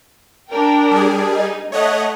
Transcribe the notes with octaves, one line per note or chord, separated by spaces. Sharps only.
D4 A#4 G5
G3 G#4
D#4
A3 C#5 D#5 F#5